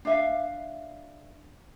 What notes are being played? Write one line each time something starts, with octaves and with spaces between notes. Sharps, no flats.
D4 E5 F5